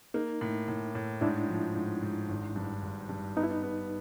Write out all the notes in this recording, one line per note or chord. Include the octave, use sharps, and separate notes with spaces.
A#3 D#4
A2
A2
A2
G#2 D4 E4
F3
G#2
G#2
G#1
G2
G#1
G2
B3 D#4
E4
D#4
B3